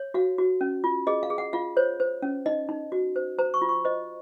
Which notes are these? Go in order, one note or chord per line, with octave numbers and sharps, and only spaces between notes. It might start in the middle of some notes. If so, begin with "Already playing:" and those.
Already playing: C#5
F#4 F5
F#4
C#4
F4
G#4 D#5
F5
G#4
F#5
F4 F5
C5 C#5
C5
C#4
D#4 D#5
D#4
F#4
C5
C5 A#5
C#6
F4
C#6
C5 D#5